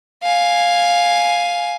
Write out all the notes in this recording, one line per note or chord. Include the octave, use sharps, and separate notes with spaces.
F5 G#5